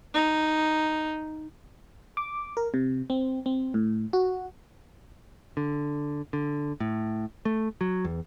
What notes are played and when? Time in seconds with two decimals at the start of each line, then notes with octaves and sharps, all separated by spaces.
0.14 D#4
2.17 D6
2.57 A#4
2.74 C3
3.10 C4
3.46 C4
3.74 A2
4.13 F#4
5.57 D3
6.33 D3
6.80 A2
7.45 A3
7.81 F#3
8.05 E2